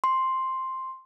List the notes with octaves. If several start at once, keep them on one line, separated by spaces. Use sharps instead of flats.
C6